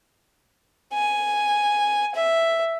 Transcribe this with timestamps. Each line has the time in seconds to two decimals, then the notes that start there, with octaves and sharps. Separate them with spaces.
0.94 G#5
2.15 E5